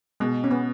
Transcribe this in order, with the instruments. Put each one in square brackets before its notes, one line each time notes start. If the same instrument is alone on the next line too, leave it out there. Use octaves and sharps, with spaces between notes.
[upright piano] B2 [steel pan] G#3
[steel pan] C#4
B3